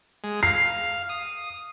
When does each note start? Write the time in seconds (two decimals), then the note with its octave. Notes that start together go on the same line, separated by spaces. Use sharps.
0.24 G#3
0.43 F5 C7
1.09 D#6